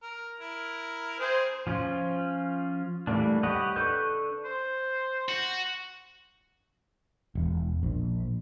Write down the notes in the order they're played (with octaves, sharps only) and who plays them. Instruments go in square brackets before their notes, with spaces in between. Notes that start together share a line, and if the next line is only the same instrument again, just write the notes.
[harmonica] A#4
E4 A#4
[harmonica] C4 G#4 [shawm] C5
[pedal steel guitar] F3 C#4 F4
E3 G3 A3 A#3 D4
G4 B4 C#5 D#5 F#5
D4 A4 B4 C#6 G6
[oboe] C5
[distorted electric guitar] F#4
[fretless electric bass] E1
A#1